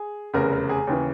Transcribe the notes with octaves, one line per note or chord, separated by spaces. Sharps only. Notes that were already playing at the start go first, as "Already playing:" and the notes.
Already playing: G#4
F1 E2 C#3 A#4
A#4
G#4
D#2 C#3 E3 G#4